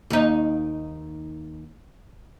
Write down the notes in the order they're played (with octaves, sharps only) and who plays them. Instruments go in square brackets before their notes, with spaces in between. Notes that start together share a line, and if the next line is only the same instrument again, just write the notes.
[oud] D#2 D#4